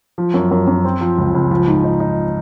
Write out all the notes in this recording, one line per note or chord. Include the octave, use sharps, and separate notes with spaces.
F3
F#2
F#2
F#2
C4
F3
C#2
C#2
F3
G#2
D#4
D#4